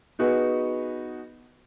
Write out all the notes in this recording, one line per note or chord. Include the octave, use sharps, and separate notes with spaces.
B3 D#4 F#4 G#4 B4